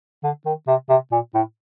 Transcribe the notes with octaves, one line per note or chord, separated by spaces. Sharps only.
D3
D#3
C3
C3
A#2
A2